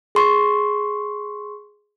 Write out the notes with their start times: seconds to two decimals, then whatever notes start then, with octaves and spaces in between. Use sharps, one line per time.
0.15 G#4 C6 C#6